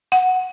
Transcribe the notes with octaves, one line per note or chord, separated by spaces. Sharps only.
F#5